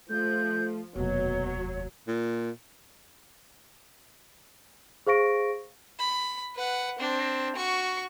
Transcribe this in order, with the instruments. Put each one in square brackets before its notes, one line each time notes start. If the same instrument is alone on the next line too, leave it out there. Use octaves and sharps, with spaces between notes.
[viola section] F3 [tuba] A3 [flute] G6
[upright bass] F1 D#2 [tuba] B2 [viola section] F#3 [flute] C#5
[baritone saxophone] A#2
[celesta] G#4 C5 F5 C#6 A#6 D7
[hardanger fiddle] B5
B4 F#5
C4 D4
F#4 C#6